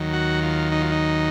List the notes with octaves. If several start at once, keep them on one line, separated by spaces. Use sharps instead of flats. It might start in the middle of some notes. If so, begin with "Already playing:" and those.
Already playing: D#2 D#3 F#3
F#4
F4
D#4
F4
D#4